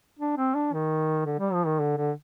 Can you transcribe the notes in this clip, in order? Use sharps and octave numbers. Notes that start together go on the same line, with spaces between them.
D4
C4
D4
D#3
D3
G3
F3
D#3
D3
D3